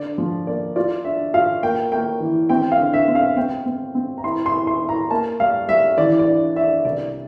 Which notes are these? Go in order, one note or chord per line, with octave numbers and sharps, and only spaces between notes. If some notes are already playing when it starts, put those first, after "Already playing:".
Already playing: D3 D5
F3
A#3 D5
F4 D5
D4 E5
F4 F5
A#3 G5
A#3 G5
E3
C4 G5
F5
D3
E5
C4
F5
C4 G5
C4
C4
A#5
E4 C6
C6
E4
C6
E4
A#5
A#3 A5
G3 F5
G3 E5
E3 D5
D5
D4
D4 E5
D5
C2 D5